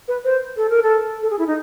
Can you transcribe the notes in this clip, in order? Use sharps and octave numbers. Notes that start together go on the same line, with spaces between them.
B4
C5
A4
A#4
A4
A4
G#4
E4
D#4